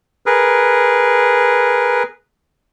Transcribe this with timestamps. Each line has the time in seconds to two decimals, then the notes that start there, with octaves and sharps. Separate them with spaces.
0.26 G#4 A#4 B4